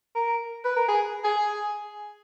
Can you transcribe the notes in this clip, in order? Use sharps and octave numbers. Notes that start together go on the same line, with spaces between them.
A#4
B4
A#4
G#4
G#4